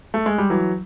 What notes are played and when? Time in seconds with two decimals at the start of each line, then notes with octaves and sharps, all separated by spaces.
0.14 A3
0.26 G#3
0.38 G3
0.50 E3 F#3